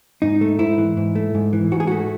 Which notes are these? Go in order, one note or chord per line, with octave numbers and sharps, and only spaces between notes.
G#2 D#4
A3
G#2 E4
E3
G#2
A3
G#2
E3
G#2 F#4
G#4
A3 F#4